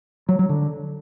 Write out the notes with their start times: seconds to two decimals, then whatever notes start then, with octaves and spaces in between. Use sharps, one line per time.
0.29 F#3
0.39 F#3
0.49 D3